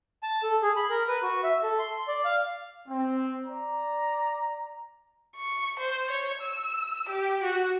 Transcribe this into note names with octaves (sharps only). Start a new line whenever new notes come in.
A5
A4
G#4
B5
A#4
B4
F#4
E5
A4
C6
D5
F5
C4
D5 A#5
C#6
C5
C#5
E6
G4
F#4